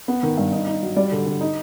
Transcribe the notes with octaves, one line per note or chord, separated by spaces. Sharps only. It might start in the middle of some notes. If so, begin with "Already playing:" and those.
B3
D#3
G2
D#4
D#4
F#3
G3 D5
D3
D3
D#4